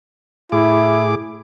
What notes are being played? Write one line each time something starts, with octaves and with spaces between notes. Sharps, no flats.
A2 E4 G#4 D6